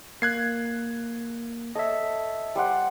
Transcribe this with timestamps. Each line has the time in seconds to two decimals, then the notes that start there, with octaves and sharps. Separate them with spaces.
0.22 A#3 F#6 G#6 C7
1.75 A4 C#5 D#5 E5
2.55 G3 C5 F#5